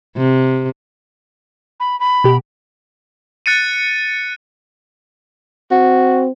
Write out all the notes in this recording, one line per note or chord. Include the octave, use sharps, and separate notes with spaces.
C3
B5
B5
B2 G4
F#6 A6 C#7 D#7
C4 F#4